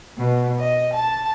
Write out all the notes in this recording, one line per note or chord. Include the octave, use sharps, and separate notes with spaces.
B2
D#5
A5